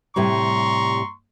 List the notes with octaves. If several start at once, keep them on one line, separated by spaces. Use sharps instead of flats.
A2 C3 G3 A#5 C6 C#6